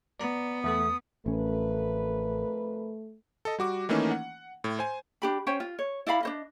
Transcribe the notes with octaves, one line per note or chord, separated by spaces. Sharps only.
B3 D5 A#5
E2 A3 A4 D#6
A1 F2 A3 C#4 A#4 B4
A4 D#5
G3 F#4 D6
D#3 E3 A3 A#3 C#4 D#4
F#5
A2
C5 G#5
D4 G4 B5
C#4 C5 C#5 G5
F4
C#5
E4 D5 F5 B5
D4 C5 D#5